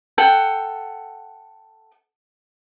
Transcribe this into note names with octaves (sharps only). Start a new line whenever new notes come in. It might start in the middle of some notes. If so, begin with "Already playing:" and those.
A4 F#5 G5